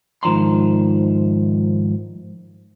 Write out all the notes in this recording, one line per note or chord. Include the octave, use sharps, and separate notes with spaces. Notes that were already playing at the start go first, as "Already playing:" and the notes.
G#2 D#3 F3 A#5 C6